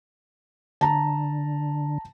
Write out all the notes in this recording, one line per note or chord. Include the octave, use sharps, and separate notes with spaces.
D3 A5 A#5